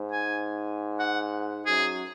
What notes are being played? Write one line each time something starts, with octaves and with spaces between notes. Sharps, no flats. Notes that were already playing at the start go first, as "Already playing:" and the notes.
Already playing: G#2
G#5
F#5
F#2 G#4